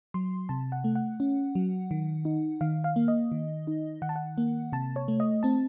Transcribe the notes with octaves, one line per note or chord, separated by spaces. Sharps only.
F#3 C6
C3 A5
F#5
A3
F#5
C#4
F#3
D#3
D#4
D#3 F5
F5
A#3
D#5
D#3
D#4
D#3 F#5
A5
F#5
A#3
C3 A5
C#5
A3
D#5
C4 A5